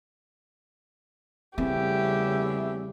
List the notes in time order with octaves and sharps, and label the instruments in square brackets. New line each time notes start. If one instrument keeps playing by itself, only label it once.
[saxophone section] E2 A3 E5 [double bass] C#3 G3 [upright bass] C4 [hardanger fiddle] G4